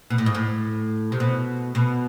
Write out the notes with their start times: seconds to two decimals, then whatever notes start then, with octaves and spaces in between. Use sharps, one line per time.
0.10 B2
0.18 A2
0.26 G#2
0.34 A2
1.12 C3
1.20 B2
1.75 B2